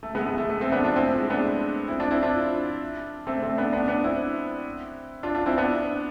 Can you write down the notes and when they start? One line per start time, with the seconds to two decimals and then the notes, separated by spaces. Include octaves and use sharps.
0.03 A3
0.15 G#3 B3
0.21 A3
0.26 G#3 B3
0.38 A3
0.50 A3
0.61 A3 C4
0.72 B3 D4
0.84 D4 F4
0.96 C4 E4
1.07 A3
1.19 G#3
1.30 B3 D4
1.88 C4 E4
2.00 D4 F4
2.11 C4 E4
2.23 D4 F4
3.27 A3 C4
3.43 A3 C4
3.58 B3 D4
3.73 B3 D4
3.88 B3 D4
4.04 C4 E4
5.23 D4 F4
5.35 D4 F4
5.46 C4 E4
5.58 B3 D4